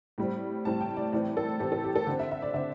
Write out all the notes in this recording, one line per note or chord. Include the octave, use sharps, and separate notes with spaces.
A2 G3 C4
A2 G3 C4 A5
G5
D5
A2 E3 C4 D5
A4
A2 E3 C4 G4
A4
G4
A4
D3 C4
E5
E5
D5
D3 C4 E5